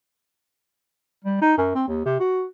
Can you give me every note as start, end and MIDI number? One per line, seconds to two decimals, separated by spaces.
1.25 1.41 55
1.42 1.55 63
1.58 1.71 42
1.75 1.85 60
1.88 2.01 39
2.06 2.18 48
2.20 2.45 66